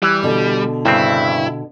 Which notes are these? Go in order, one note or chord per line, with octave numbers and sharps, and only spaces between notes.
E3 G3
B2 D3
G2 C#3 C4 E4